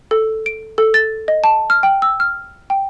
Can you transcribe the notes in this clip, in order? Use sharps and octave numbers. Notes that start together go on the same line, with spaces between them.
A4
D7
A4
A6
D#5
A5
F6
G5
E6
F6
G5